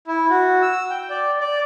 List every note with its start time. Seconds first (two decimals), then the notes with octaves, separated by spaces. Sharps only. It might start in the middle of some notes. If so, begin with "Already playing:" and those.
0.07 E4
0.30 F#4
0.63 E6
0.90 G5
1.10 D5
1.40 D5